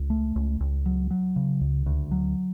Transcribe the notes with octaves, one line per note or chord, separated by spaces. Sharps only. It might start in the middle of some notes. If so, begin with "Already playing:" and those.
Already playing: C#2
A3
C#2
C#2
F#3
F#3
C#3
C#2
D2
F#3